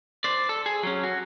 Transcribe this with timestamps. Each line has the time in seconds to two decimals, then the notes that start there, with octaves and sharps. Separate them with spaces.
0.24 C5 D5
0.49 A4
0.66 G#4
0.83 F#3 C#4
1.03 F#4